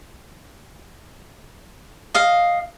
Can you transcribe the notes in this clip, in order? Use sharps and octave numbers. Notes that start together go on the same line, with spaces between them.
D#5 F5